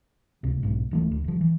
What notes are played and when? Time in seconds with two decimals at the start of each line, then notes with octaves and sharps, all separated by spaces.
0.43 D1 C#2 C3
0.63 B1 G#2
0.91 D1 E3 A3
1.11 D2
1.24 F1 F3
1.41 E3